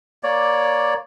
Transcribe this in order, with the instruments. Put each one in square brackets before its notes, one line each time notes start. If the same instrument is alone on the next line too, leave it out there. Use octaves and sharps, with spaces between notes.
[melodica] A#3 C#5 D5